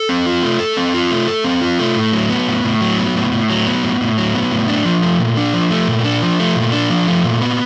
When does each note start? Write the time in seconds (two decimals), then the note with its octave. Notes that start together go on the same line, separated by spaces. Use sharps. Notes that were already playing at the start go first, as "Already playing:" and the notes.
Already playing: A4
0.09 C4
0.26 F4
0.43 A3
0.60 A4
0.77 C4
0.94 F4
1.11 A3
1.28 A4
1.44 C4
1.62 F4
1.79 A3
1.96 A2
2.13 F#3
2.30 B3
2.47 A2
2.64 A2
2.81 F#3
2.98 B3
3.15 A2
3.32 A2
3.50 F#3
3.67 B3
3.83 A2
4.01 A2
4.18 F#3
4.35 B3
4.51 A2
4.68 D4
4.85 F3
5.02 A3
5.19 A#2
5.37 D4
5.54 F3
5.70 A3
5.88 A#2
6.04 D4
6.22 F3
6.39 A3
6.56 A#2
6.73 D4
6.90 F3
7.07 A3
7.24 A#2
7.42 B3